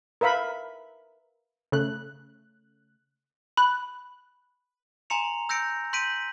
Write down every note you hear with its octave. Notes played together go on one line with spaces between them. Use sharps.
A#4 B4 E5 F5 B5
C#3 A3 F#6
B5 F#6
G#5 A#5 C6 C#7 F7
E6 G6 A#6 C#7 D7
C6 G6 B6 D7 D#7